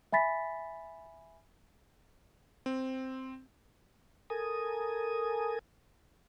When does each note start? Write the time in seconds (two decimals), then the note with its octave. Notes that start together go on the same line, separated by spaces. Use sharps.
0.12 E5 G#5 B5 A6 B6
2.66 C4
4.30 A4 A#4 G#5 D#6